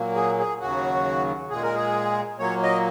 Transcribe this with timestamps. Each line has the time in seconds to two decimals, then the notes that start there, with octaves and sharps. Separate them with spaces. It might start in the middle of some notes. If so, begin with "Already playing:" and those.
Already playing: A#2 F#3 A#3
0.15 G#4
0.38 G#4
0.60 D#2 C#3 F#3 F#4
1.50 A#2 G#3 G#4
1.63 A#4
1.75 G#4
2.39 A#2 F#3 A#3 C#5
2.62 D#5